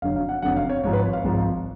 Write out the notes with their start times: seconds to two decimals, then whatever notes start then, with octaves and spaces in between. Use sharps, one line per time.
0.02 F1 F2 D3 F#3 F5
0.16 F5
0.29 F#5
0.42 F1 F2 D3 F#3 F#5
0.57 F5
0.70 C#5
0.84 G#1 G#2 F3 C#5
0.93 B4
1.03 C#5
1.13 F5
1.24 G#1 G#2 F3